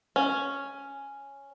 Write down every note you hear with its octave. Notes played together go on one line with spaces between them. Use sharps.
C#4